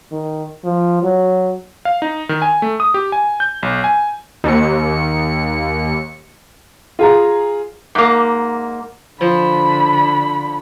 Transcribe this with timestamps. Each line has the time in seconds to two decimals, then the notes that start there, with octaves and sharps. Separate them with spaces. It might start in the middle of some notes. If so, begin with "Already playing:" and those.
0.12 D#3
0.64 F3
1.03 F#3
1.85 F5
2.02 D#4
2.29 D#3
2.42 G#5
2.62 A3
2.80 D#6
2.94 G4
3.12 G#5
3.40 G6
3.63 B1
3.84 G#5
4.44 D#2 C#7
6.99 F4 G#4 A#5
7.95 G#2 A#3
9.21 D3 F3 B5